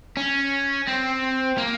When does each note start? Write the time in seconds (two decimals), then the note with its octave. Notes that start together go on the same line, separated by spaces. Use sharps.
0.17 C#4
0.87 C4
1.58 A#3